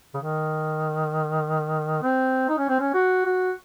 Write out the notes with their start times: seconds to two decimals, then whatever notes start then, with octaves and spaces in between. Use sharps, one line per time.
0.14 C#3
0.18 D#3
2.02 C4
2.49 D#4
2.58 C#4
2.69 C4
2.80 C#4
2.94 F#4
3.25 F#4